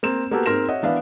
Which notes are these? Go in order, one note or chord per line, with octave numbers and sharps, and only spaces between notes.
A#3 C4 E7
A#3 B3 F#4 G4 A4
G#2 C4 A#4 C6 A#6 E7
C#5 D#5 E5 F#5
E3 B3 D4 E5 F5